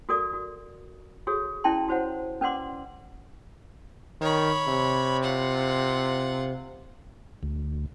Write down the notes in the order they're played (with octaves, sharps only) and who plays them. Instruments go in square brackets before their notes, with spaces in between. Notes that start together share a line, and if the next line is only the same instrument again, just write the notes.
[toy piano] F#4 A4 A#4 D5 D#6
F#4
F#4 G#4 A4 C#5
C#4 E4 D5 G5 A5 C6
F#4 C5 C#5 F#5
C#4 B4 D5 F#5 C6 D6
[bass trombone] D#3 [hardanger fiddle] C#5 B5
[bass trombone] C3
[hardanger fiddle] F4 F#5
[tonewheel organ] D2